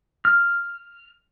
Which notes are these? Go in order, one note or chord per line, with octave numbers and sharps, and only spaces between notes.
F6